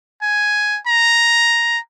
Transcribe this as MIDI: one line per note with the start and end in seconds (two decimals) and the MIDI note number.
0.22 0.78 80
0.87 1.79 82